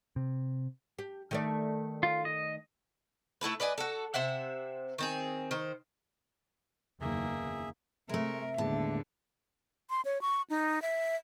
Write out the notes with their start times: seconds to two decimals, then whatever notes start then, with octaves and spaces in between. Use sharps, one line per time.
0.16 C3
0.99 G4
1.31 D#3 A3 D5
2.03 F4
2.25 D#5
3.41 A3 E4 A4 B4
3.60 B4 D5 D#5 G#5
3.78 F#4 A4
4.14 C3 C5 E5 F#5
4.98 D#3 C4 G#4
5.51 D#3 C5
7.01 F#1 E2 D#3 A#3 G#4 E5
8.09 C3 G#3 A3 A#4 E5
8.58 D#2 A2 D3 G#3 B3 A5
9.90 C6
10.05 C#5
10.21 C#6
10.50 D#4
10.82 E5